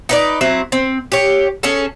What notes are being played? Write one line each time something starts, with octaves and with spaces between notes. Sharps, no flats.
D#4 B4 D5
F#3 C4 E4
C4
G4 C#5
C#4 G#4 A4